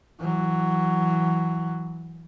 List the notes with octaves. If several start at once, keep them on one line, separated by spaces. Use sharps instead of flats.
E3 F#3